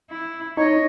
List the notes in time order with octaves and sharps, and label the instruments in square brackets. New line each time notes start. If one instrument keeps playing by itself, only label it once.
[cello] E4
[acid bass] D#4 [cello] C#5 D#5